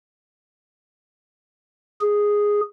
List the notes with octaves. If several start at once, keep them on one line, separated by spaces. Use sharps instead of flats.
G#4